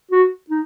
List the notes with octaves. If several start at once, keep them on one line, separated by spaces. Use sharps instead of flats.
F#4
D#4